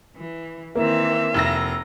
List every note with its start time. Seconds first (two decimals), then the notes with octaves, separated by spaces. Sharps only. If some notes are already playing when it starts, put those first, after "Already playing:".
0.16 E3
0.75 D#3 E3 A#3 C4 E5
1.34 F1 A#5 E6 A#6